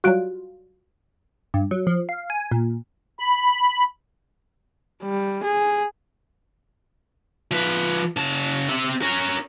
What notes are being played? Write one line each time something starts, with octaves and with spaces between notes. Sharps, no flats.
F#3 G3 F4 F#4 F#6 D7
G2
F#3
F3
F5
G#5
A#2
B5
G3
G#4
F3 B4
C#3 A5
C4 E5
C#4 A#4